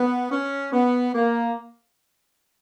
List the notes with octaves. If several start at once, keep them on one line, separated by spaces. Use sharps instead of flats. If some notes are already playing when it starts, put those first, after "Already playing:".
Already playing: B3
C#4
B3
A#3